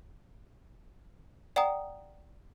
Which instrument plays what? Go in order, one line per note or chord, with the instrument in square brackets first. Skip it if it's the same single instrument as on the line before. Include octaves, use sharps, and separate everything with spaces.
[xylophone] D5 F#5 G5 A#5 D#6